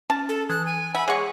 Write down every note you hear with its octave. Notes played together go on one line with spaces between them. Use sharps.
C#4 A5
A4
E3 D#6 F#6 G#6
G#5
E5 F#5 G#5 B5
G#3 G#4 C#5 F#5 C#6